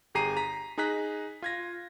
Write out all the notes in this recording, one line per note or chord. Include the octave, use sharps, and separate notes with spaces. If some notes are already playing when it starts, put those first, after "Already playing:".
G1 G4 G#4 A#5 C7 D#7
A#5 B6
D#4 G#4 A#5 F#6 B6
F4 G#6 A#6